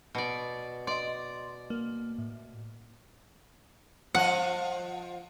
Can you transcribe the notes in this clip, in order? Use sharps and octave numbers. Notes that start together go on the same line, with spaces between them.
B2 D5
D5 D#5 C6
A#3
A2
F3 D#5 F#5